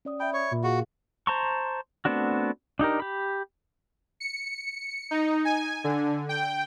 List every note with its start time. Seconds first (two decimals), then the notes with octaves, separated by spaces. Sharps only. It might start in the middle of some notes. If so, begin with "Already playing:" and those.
0.05 C#4 D5 D#6
0.20 E5 G5 B5
0.33 C#5
0.51 A#2
0.64 F#4 G#4 F5
1.27 C5 A5 A#5 C6 C#6
2.05 A3 B3 C4 D4 F#4
2.79 D4 D#4 G4 A#4
3.00 G4 B5
4.20 C#7
5.11 D#4
5.45 G#5
5.84 D3
6.29 G5